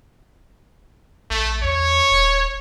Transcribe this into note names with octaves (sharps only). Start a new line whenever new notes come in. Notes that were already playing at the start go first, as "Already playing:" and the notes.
A#1 A3
E2 C#5
D#1